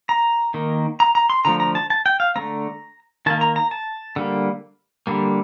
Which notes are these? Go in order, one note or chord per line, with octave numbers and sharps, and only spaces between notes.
A#5
D#3 A#3
A#5
A#5
C6
D3 F3 A3 A#5
A#5
A5
A5
G5
F5
D3 A3 C4 A#5
D#3 A#3 A5
A#5
A#5
A5
D3 G3 A#3
D3 G3 A#3